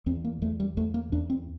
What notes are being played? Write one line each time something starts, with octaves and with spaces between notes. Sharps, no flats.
E2 C4
A#3
E2 A3
G3
E2 A3
A#3
E2 D4
C4